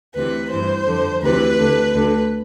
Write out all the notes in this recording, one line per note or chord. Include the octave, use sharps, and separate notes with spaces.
D2 C3 E3 B4
G2 E3 C5
F2 D3
D2 C3 E3 B4
D2 D3
D2 D3